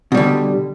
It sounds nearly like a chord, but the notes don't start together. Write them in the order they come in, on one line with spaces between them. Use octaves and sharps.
B2 G3 D3